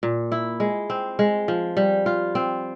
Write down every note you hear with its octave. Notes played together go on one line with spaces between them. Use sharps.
A#2
E4
G#3
C4
G#3
F3
G3
F4
C4